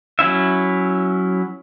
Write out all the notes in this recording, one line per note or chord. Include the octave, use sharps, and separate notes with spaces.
F#3 C#4 E4 E5